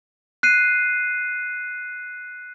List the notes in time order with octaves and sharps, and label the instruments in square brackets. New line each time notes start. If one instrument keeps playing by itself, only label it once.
[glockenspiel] F#6 C7 D#7